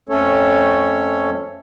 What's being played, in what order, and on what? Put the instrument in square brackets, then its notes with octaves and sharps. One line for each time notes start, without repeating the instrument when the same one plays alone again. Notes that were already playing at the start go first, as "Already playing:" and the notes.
[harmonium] F2 A3 C#4 A4 C#5